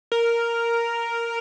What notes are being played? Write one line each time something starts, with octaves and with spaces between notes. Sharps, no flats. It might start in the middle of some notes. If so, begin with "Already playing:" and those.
A#4